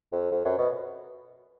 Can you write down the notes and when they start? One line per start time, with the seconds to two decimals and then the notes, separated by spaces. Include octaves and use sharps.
0.12 F2
0.32 F2
0.45 F#2
0.58 B2